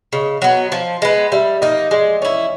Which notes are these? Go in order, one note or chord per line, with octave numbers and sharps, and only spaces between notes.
C#3 D#5
F#3 B3
F3
G#3 B3
G3 E5
A#3 D#4 D#5
G#3 D5
C#4 E4 C#5